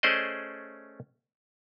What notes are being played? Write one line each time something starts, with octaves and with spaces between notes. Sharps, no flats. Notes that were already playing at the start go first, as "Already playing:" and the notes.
A3 C#4 G#4 C5 D5 D#5